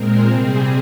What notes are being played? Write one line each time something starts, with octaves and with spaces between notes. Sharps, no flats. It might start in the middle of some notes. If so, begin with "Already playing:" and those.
Already playing: A#2 G#3 C4 A#4
C3 G3 C4 G#4